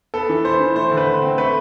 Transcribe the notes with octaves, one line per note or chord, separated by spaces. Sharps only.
B3 A4
E3
B3 C5
E3
A3 C5
D3
B4
D3 C5
C4
A3 B4